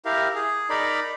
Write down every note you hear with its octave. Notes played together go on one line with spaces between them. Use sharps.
E4 G4 A#4 F5
G#4
D#4 A#4 D5 B5